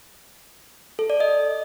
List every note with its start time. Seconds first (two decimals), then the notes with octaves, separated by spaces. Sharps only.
0.99 A4
1.10 D5
1.20 D#5